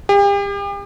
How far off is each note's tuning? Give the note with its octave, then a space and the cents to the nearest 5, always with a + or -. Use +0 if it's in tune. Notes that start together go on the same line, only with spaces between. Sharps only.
G4 +40